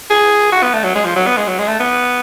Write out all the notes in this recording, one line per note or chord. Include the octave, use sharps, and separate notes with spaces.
G#4
F#4
B3
A3
F#3
G#3
F3
F#3
B3
G#3
F#3
G#3
A3
B3